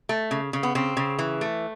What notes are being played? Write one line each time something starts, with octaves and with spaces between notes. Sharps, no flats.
A3
C#3
C#3
B3
C#3 C4
C#3
E3
A3